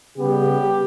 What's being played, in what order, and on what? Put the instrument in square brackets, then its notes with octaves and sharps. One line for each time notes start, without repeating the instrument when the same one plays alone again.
[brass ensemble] C#3 G3 B3 G4